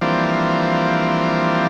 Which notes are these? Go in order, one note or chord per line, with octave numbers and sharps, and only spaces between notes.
E3 F3 G3 A#3 C4 D4